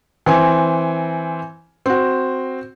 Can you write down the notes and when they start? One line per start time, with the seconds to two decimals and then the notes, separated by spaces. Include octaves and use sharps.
0.26 E3 C4 G#5
1.86 C4 F#4